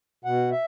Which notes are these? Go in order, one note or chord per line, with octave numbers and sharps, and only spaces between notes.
B2 F#5
E5